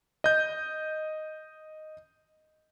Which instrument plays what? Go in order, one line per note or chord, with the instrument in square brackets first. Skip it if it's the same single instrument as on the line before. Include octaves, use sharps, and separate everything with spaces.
[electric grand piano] D#5 G6